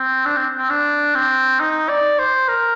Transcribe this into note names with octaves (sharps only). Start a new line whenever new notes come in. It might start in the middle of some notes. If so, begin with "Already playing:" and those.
Already playing: C4
D4
C4
C4
D4
C4
D#4
D5
C5
A#4